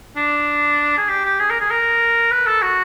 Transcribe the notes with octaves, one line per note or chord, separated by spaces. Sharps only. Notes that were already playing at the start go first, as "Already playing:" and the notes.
D4
G#4
G4
G4
G#4
A#4
G#4
A#4
B4
A4
F#4